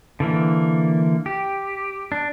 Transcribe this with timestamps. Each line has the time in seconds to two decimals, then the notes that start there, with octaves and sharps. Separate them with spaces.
0.20 D3 E3 A#3
1.26 G4
2.12 D4